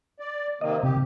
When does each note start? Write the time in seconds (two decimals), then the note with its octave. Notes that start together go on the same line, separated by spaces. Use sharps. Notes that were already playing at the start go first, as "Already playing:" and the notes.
0.20 D5
0.61 C3 D#3 A#3 D#5
0.83 C3 G4